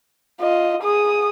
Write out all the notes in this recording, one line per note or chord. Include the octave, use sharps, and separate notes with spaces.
F4 D#5
G#4 D#6